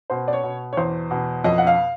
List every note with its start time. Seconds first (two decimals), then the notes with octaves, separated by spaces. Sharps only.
0.10 B2 C5
0.28 D5
0.33 C#5
0.43 B2
0.73 C#5
0.77 E2 C5
1.11 B2
1.44 F2 D#5
1.58 F#5
1.67 F5